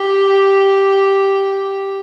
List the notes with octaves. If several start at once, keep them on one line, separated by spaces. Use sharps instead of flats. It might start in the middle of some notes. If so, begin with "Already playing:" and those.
Already playing: G4